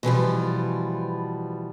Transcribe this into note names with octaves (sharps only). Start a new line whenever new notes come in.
B2 E3 F3 G3